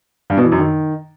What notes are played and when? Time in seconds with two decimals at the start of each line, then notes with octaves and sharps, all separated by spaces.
0.30 G2
0.37 B2
0.44 E3
0.52 F#2
0.59 D#3